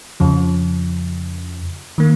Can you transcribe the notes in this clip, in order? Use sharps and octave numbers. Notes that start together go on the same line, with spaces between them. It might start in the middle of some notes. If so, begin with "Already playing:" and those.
F2 C#3 F3
D#3 A#3